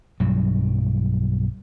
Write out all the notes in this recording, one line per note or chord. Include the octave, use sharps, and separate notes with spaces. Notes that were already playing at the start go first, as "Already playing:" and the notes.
B1 G2 F#3